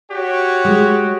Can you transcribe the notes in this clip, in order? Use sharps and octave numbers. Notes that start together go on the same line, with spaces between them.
F#4 G4 C#5
G#3